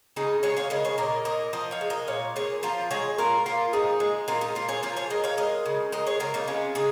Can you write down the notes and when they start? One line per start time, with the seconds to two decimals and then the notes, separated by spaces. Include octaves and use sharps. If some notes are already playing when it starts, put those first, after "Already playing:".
0.16 C#3 D#4 G#4
0.43 G#3 G#4 C#5
0.57 C#5 F5
0.70 C#3 A#4 D#5
0.85 G#4 C#5
0.98 A#2 A#4 D#5
1.25 A#2 A#4 D#5
1.53 F3 A#4 D#5
1.71 C#5 F5
1.81 G#3
1.90 A#4 D#5
2.08 A#2 C#5 F5
2.36 A#2 G#4 C#5
2.63 F3 F4 A#4
2.91 G#3 G#4 C#5
3.18 A#2 F4 A#4
3.46 A#2 F4 A#4
3.73 F3 D#4 G#4
4.00 G#3
4.28 A#2 F4 A#4
4.41 D#4 G#4
4.55 A#2 F4 A#4
4.69 G#4 C#5
4.83 F3 F4 A#4
4.96 G#4 C#5
5.10 G#3 A#4 D#5
5.24 C#5 F5
5.37 G#3 A#4 D#5
5.66 C#3
5.92 G#3 A#4 D#5
6.07 G#4 C#5
6.20 C#3 F4 A#4
6.34 A#3 D#4
6.47 G#3 C#4 F4
6.75 C#3 D#4 G#4